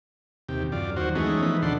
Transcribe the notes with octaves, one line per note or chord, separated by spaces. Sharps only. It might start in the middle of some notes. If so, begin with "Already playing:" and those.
D#2 C3 G4
F#2 F4 D5
D#2 F#3 F#4 C5
E3 G#3 A3 B3 C#4 D#4
E3 F3 D#4 B4
D2 B2 D4 A4 F#5 C6